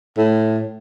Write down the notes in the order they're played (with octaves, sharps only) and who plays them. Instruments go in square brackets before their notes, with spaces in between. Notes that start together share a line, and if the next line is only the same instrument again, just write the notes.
[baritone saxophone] A2